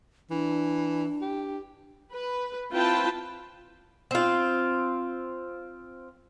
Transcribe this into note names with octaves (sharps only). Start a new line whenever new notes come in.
E3 D4
G4
B4
C4 E4 F4 B4 G5 A5
C4 F4